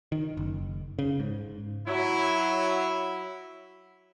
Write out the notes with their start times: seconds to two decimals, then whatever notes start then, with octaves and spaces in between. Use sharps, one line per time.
0.12 D#3
0.37 F#1
0.99 C#3
1.20 G#2
1.87 F#3 E4